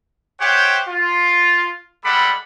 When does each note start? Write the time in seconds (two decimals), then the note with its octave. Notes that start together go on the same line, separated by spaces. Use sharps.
0.40 G4 C5 C#5 E5 F#5 G5
0.88 F4
2.04 G3 G#3 A4 D5 F#5 B5